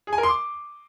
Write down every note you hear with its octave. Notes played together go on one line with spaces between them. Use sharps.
G#4
G#5
A#4
C6
D6